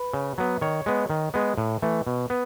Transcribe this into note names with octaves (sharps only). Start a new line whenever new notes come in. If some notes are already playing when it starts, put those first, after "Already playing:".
Already playing: B4
C#3
F#3 B3
D#3 C#5
G#3 B3
D#3
G#3 B3
A2
E3 A3
B2
B3